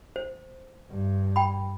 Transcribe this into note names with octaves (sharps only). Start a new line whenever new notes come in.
C5
G2
G5 B5